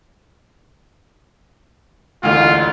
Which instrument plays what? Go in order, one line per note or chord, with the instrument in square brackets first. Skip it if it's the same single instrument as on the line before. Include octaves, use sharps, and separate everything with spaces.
[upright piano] E1 A1 D2 [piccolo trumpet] F4